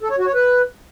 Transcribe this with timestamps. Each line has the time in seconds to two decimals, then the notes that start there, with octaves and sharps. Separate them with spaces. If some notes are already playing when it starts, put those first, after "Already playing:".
0.03 A4
0.11 C#5
0.19 F#4
0.26 C#5
0.34 B4